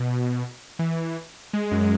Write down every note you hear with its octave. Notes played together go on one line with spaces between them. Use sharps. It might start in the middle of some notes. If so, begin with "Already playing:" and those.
Already playing: B2
E3
G#3
F#2